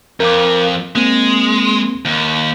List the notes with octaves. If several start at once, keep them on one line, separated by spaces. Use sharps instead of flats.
F2 A#4 F5 D6
G#3 A#3 C4
D#2